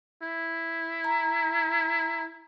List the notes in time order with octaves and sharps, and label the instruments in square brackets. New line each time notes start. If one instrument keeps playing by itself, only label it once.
[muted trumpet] E4
[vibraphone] A#5